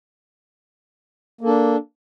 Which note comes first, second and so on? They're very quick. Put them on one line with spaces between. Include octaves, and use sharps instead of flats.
A#3 A4 D4